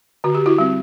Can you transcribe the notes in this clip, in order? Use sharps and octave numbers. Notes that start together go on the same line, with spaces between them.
D3 F#4
G4
E4 F#4
G3 C4